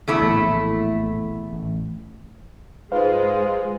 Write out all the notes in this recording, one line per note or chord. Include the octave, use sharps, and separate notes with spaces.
E2 A3 E4
A#1 A2
A1
G#2 G#3 F4 B4 C5 F5